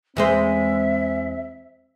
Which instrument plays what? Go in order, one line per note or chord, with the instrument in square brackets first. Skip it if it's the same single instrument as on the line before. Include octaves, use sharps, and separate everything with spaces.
[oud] E2 G#3 C5 [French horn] C4 [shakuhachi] E5